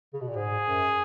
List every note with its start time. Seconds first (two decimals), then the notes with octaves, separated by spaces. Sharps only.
0.14 C#3
0.21 B2
0.28 A#2
0.36 G#2 G#4
0.66 F#2